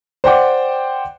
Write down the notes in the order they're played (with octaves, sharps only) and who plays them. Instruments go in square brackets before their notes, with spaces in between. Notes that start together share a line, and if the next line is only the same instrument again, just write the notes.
[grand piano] C5 D5 F#5 G5 D6